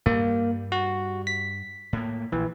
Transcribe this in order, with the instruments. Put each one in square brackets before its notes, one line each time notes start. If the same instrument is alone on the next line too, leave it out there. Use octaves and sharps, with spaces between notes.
[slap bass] G2 G3 [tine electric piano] A#3
[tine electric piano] F#4
B6
[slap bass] A2 A#3
[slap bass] A#1 [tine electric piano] E3